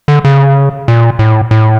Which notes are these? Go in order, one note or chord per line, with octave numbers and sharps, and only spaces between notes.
D3
C#3
A#2
A2
A2